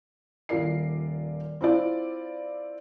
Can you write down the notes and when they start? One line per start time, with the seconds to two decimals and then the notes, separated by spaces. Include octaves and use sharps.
0.49 D#1 F4 A#4 D5 C7
1.61 C4 E4 F4 D5